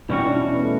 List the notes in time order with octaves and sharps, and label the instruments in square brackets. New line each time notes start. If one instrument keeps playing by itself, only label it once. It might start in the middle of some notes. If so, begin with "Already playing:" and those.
[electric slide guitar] E2 B2 G3 C#4 F#4 [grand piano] D4
[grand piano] E4
D4
B3
A3